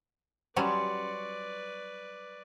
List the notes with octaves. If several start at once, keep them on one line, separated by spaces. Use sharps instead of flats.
F#3 G3 C#4 B4 D5 C6 C#6